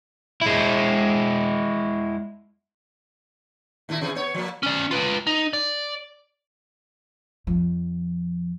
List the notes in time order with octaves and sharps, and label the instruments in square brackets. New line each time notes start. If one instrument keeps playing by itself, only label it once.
[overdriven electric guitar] G#3 E4
[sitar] D#2 A#2 E4
C3 E3 G#4
B3 C#5
F3 A#3
[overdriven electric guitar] C#4 D5
F4 B4
D#4
D5
[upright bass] F2 F3